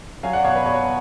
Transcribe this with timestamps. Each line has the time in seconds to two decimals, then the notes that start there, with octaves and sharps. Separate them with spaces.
0.23 F#3 F5 G#5
0.33 D5 F#5
0.44 B2 C#5 F5
0.56 B4
0.66 B2 C#5